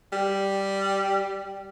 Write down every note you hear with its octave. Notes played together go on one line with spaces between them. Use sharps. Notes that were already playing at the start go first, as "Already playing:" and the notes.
G3